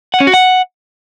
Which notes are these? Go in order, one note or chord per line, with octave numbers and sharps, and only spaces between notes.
F#5
C#4
F#4
F#5